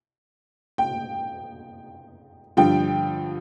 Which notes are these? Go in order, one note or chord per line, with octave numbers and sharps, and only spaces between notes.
G5
G2 D3 F3 G5